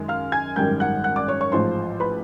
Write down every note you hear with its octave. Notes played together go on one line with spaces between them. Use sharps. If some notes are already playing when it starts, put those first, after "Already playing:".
Already playing: F#2 D#3 G#3
F5 F6
G#5 G#6
G#1 F#2 D#3 G3 G5 G6
F#5 F#6
F#5 F#6
D5 D6
C#5 C#6
C#5 C#6
A1 G#2 F3 C5 C6
B4 B5